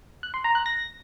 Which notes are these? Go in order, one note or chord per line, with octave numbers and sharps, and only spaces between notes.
F#6
C6
A#5
F#6
A#6